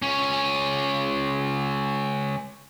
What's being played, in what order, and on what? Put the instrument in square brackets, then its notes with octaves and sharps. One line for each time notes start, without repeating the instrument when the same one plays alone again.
[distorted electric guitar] C#2 C#4